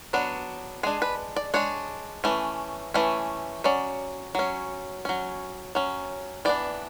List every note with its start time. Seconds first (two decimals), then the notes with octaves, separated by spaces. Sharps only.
0.13 F#3 B3 D4
0.83 G#3 D4 G#4
1.02 B4
1.36 D5
1.54 G#3 D4 C#5
2.24 E3 A3 C#4
2.94 E3 A3 C#4
3.64 F#3 C#4 D5
4.35 F#3 C#4
5.05 F#3 C#4
5.75 F#3 C#4
6.45 E3 B3 D4 D5